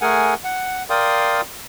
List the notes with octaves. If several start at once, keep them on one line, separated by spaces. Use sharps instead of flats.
A3 G#4 A#4 F#5 G#5
F#5
A#4 D5 F5 G5 C6 D#6